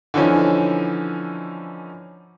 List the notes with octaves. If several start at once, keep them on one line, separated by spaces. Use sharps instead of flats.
D3 E3 F3 C#4 D#4